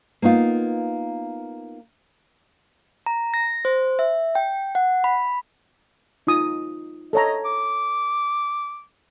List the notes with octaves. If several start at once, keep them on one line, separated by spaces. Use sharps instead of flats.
A#3 B3 D#4 F4
A#5
A#6
C5
E5
G5
F#5
B5
D#4 F4 D#6
A4 C#5 D#5 A#5
D6